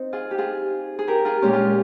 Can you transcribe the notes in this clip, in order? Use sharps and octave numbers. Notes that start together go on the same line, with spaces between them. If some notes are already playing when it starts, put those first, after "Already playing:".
Already playing: C4 D#4
F4 G#4
G4
F4 G#4
G#4
G4 A#4
F4 G#4
A#2 G#3 C#4 G4
F4